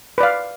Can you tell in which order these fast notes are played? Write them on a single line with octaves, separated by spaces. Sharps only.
B4 D5 F5